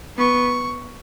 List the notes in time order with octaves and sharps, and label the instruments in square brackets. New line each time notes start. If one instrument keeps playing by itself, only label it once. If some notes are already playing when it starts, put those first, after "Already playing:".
[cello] B3 [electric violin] C#6